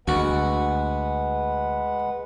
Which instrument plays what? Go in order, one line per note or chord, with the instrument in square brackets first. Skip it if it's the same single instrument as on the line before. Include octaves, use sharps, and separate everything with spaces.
[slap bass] D2 [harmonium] G#3 B4 F#5 [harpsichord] F#4